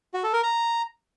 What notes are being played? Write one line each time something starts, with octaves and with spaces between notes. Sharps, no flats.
F#4
A4
A#4
A#5